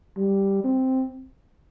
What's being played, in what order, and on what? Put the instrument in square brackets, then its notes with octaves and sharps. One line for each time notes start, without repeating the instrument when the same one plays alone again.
[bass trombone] G3
C4